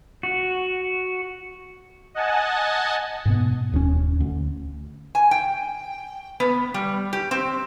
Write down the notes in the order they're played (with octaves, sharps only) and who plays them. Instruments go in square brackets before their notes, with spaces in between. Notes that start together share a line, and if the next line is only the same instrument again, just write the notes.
[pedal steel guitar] F#4
[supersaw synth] D#5 F#5 G#5 A5
[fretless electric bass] G#2 B2 B3
D#1 D#2 D3 C#4
D2
[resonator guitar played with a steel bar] G#5
G5
B3
G3
G4
C4